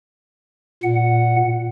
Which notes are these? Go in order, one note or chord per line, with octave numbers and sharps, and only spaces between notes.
A#2 F#5